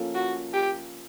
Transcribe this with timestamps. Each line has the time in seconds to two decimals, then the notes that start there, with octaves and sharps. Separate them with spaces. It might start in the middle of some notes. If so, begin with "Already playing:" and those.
Already playing: F3 A#3 C#4 F4 A4
0.15 F#4
0.53 G4